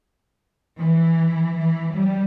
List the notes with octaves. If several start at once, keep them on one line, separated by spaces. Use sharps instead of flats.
E3
E3
G3